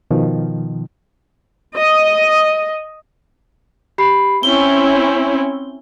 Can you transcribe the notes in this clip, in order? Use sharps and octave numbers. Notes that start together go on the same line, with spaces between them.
B2 D#3 F3
D#5
G4 B5 C7
C4 C#4 E4 G7